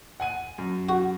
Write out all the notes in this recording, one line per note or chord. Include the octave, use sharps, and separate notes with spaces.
F#5 G#5 D#7
F#2
F#4